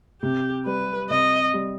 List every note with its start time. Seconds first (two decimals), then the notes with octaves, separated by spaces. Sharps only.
0.22 C3 G4
0.66 G3 B4
1.10 C3 D#5
1.54 G3